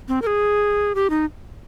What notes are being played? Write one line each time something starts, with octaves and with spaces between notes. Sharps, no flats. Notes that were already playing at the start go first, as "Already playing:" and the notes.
C4
A#4
G#4
G4
D#4